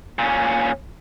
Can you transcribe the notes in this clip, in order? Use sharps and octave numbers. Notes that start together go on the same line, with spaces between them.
A#2 C#4